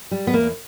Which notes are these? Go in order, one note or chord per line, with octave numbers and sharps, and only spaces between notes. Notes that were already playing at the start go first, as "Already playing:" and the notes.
G3
B3
E2 A#3